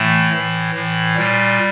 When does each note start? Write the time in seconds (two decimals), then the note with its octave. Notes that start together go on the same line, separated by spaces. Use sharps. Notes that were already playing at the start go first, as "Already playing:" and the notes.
Already playing: A2 E3 A3
0.33 A2 E3
0.75 A2 E3
1.16 A#2 G3